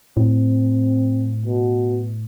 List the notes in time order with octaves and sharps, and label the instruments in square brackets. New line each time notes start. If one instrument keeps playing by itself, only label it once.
[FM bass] A2 [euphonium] C4
[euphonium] B2